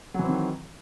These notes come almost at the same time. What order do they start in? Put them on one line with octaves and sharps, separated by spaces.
F#3 E3 C4 D#3